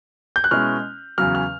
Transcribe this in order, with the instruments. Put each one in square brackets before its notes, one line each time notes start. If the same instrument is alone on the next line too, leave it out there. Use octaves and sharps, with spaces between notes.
[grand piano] G6
F#6
B2 G#3 C#4 E4 F6
E2 C#3 F#3 F6
F6